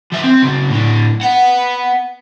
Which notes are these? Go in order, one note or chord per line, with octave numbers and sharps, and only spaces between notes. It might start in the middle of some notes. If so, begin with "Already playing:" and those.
F3 E5
C4
C#3 F#3
A2 D4
B4 F#5